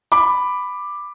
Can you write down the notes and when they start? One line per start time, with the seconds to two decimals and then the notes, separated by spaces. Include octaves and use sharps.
0.12 B5 D6